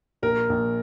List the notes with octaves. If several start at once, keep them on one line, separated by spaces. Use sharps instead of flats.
A#1 A#4
A#1